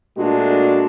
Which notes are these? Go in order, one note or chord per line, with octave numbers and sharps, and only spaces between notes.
A#2 G#3 A3 D4 F#4